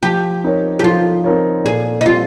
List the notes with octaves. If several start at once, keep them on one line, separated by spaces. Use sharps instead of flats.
F3 G4
C4 D#4 A#4 C#5
G4
F3 F4
C4 D#4 A#4 C#5
A#2 G#4
D#4
G3 C4 F4